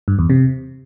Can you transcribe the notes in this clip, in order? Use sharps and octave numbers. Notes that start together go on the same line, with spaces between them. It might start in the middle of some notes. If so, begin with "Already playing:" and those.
G2
E2
C3